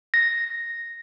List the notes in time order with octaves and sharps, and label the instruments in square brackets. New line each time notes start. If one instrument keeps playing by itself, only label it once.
[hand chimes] A#6